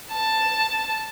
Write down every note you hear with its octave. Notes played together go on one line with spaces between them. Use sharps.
A5